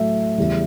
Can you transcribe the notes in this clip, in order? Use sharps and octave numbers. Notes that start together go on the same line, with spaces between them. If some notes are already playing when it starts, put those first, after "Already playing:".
Already playing: A2 F#3 A3 E5
E2 C#3 G3